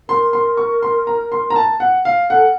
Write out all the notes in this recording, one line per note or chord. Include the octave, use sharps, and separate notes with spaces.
A#4 C6
C6
C#6
C6
A#5
C6
A#5
A5
F#5
F5
A4 F#5